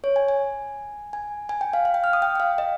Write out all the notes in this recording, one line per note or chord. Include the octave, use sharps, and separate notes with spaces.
C#5
G#5
G#5
G#5
G#5
G5
F5
F5
G5
F6
D#6
G5
G5
F5
D#5